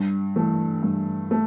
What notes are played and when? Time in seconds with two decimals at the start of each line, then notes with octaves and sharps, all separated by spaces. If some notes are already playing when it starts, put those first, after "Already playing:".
Already playing: G2
0.36 E3 A3
0.83 G2
1.31 A3